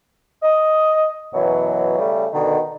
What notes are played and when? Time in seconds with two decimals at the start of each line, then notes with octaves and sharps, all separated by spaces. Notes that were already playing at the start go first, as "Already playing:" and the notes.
0.43 D#5
1.34 F#2 B2 E3 F#3
1.99 C#3 G3 A3
2.33 B2 D3 D#3